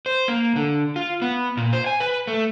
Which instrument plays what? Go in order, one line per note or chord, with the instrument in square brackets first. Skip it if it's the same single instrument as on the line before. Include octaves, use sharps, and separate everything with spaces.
[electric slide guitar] C5
A#3
D3
F4
B3
A#2
C5
G#5
B4
A3